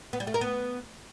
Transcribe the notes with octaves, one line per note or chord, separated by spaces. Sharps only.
B3
G3
A3
A#4
B3